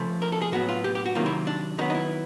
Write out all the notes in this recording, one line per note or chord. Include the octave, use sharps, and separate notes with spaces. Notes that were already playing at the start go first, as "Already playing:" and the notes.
Already playing: C#3 F3 A3
A#4
A4
G#4
A2 F#3 B3 F#4
F4
G4
G4
F#4
C3 D#3 F#3 A#3 F4
E4
D4
D#3 F#3 B3 D#4
D#4
E4